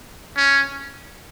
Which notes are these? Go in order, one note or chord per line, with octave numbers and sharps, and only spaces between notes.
C#4